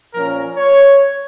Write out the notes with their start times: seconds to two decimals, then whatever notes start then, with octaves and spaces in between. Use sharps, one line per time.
0.14 A#2 F3 C#4 A#4
0.57 C#5